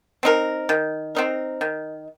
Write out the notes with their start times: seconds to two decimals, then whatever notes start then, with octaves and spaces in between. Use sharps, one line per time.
0.23 C4 D#4 A#4
0.69 D#3
1.15 C4 D#4 A#4
1.61 D#3